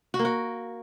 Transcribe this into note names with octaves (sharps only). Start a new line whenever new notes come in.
F#4
A#3
F#4